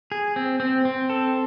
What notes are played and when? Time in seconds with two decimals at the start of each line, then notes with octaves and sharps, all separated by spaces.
0.12 G#4
0.36 C4
0.60 C4
0.85 C4
1.10 A4